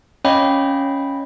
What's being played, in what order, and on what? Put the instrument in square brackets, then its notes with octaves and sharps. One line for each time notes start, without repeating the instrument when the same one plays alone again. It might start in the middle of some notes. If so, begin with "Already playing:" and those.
[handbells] C#4 C#5 D#5 F5 G5 B5